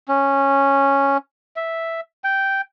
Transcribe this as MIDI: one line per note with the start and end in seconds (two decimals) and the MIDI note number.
0.08 1.17 61
1.56 2.01 76
2.24 2.61 79